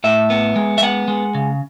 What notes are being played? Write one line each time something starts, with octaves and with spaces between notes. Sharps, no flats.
A2 E5
B3
G#3
E5
B3 F#5
G#3
C#3